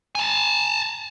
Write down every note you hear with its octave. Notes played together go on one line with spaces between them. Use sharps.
G#5 A5